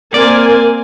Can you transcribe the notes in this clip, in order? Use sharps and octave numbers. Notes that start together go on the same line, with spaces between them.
A#3 C4 D5 G#5